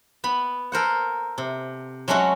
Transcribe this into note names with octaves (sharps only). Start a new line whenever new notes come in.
B3 B5
A4 A#4 C5 F#5
C3
F#3 G#3 A3 C#4 F#4